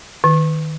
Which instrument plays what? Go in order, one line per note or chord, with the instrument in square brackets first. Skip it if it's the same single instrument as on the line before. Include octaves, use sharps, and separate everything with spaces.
[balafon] D#3